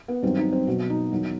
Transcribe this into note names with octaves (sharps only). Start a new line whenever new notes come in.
B3
G2 D#3 F#3 C4
D#4
C4
B2 F#3 F#4
D#4
E2 D#3 F#3